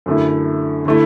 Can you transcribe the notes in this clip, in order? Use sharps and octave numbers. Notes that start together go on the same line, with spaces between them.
F#2 D3 A3 E4
D3 A3 E4